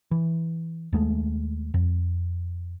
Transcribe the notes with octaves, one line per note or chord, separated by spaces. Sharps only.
E3
D#2 G#3 A3
F2